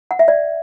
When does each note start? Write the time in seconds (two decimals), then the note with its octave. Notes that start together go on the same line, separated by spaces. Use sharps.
0.11 F#5
0.19 E5
0.28 D5